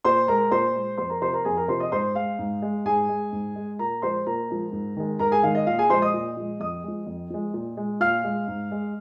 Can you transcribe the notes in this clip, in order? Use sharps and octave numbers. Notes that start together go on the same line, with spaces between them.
A#2 C5 C6
G#3 A#4 A#5
A#2 C5 C6
G#3
F2 C5 C6
A#4 A#5
C3 F3 C5 C6
A#4 A#5
F2 G#4 G#5
A#4 A#5
C3 F3 C5 C6
D#5 D#6
G#2 C5 C6
G#3 F5
G#2
G#3
G#2 G#4 G#5
G#3
G#2
G#3
A#2 A#4 A#5
F3 G#3 C5 C6
A#2 A#4 A#5
F3 G#3
G#2
D#3 G#3
G#2 A#4 A#5
G#4 G#5
D#3 G#3 F5
D#5
A#2 F5
G#4 G#5
F3 G#3 C5 C6
D#5 D#6
A#2
F3 G#3
F2 D#5 D#6
F3 G#3
F2
F3 G#3
A#2
G#3
A#2 F5 F6
G#3
G#2
G#3